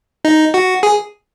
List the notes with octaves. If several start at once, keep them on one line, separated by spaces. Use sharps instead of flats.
D#4
F#4
G#4